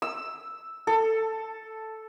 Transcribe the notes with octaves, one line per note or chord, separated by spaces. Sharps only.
E6
A4